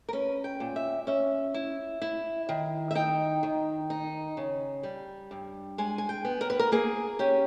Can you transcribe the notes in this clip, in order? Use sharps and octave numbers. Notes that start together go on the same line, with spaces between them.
A#4
C#4 B4
G5
A#2
E5
C#4 E5
E4
E4
D#3
E5
D#4 G5
D#3
D#4
C#3
G3
G2
G#3 G#5
G#5
G5
B3
A#4
B4
A#4
A#3 G#4
C#4 G4